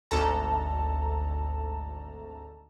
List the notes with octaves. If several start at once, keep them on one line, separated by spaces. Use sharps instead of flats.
G#1 D2 A4 A5 A#5